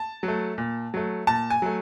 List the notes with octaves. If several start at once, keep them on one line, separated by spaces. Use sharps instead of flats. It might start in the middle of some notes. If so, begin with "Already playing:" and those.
Already playing: A5
F#3
A3
A#2
F#3 A3
A#2 A5
G#5
F#3 A3